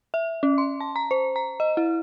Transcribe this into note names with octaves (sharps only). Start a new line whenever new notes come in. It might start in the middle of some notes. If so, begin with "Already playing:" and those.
E5
C#4
C6
A5
A#5
C5
A#5
D#5
E4